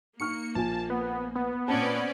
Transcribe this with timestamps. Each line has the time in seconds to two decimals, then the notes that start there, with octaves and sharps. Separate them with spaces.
0.20 A#3 D#4 C#6 F6 C#7
0.55 A#1 F3 G#5 A5
0.90 B3
1.36 B3
1.68 A#2 C4 C#4 D5 A5